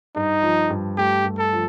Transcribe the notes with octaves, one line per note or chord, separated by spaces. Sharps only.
G2 D#4
F3
G2
A3 G4
G2
A4
F3